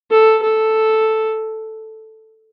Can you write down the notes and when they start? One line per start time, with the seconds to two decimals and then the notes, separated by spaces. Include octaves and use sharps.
0.11 A4
0.43 A4